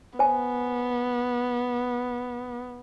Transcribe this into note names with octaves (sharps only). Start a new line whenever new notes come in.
B3 C5 G#5